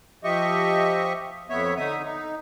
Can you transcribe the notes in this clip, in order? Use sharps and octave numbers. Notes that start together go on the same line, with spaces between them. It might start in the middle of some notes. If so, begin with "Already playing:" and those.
F3 G4 D#5 E5 C#6
F2 B3 C#5 E5
D3 D#4 E5 D#6
D#4